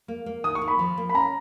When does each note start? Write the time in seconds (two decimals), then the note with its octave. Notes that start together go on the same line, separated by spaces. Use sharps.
0.08 A#3
0.26 A#3
0.44 D#3 D#6
0.55 C#6
0.62 D#3
0.68 B5
0.79 F3
0.97 A#3
1.09 B5
1.14 C#4 A#5